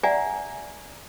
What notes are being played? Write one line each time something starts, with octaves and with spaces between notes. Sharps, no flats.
D5 E5 F#5 G#5 A#5